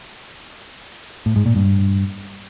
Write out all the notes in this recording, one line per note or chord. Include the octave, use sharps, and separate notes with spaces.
A2
G#2
A#2
G2